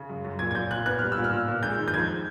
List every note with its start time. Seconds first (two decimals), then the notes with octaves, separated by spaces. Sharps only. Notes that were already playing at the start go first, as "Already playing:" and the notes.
Already playing: C#3
0.09 F#2
0.25 F#2
0.39 A#2 G#6
0.51 G#6
0.54 A#2 G6
0.71 A#2 F#6
0.86 B3 F#6
0.99 G3 F6
1.12 E6
1.17 A#2
1.24 F6
1.32 A#2
1.48 A#2
1.63 G#3 G6
1.78 D#3
1.88 G6
1.94 F2 G#6